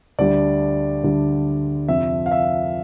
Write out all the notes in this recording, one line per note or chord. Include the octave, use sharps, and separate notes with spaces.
D2 D3 G3 D4 D5
D2 D3 G3 D4
F2 C3 F3 E5
F5
E5